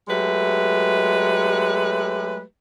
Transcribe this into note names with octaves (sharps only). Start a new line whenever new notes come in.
F#3 G#3 A3 G4 B4